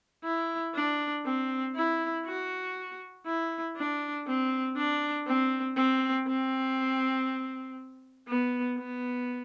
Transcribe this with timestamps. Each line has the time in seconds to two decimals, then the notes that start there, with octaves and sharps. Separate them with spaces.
0.24 E4
0.75 D4
1.25 C4
1.75 E4
2.25 F#4
3.26 E4
3.76 D4
4.27 C4
4.77 D4
5.27 C4
5.76 C4
6.27 C4
8.28 B3
8.78 B3